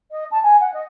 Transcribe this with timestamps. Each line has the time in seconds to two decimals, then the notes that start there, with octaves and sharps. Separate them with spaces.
0.11 D#5
0.31 A5
0.43 G#5
0.60 F#5
0.74 D#5